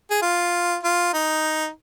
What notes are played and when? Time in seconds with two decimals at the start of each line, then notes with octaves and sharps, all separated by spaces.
0.11 G#4
0.22 F4
0.83 F4
1.13 D#4